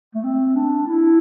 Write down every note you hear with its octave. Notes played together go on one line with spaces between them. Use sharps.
A3
C4
D4
E4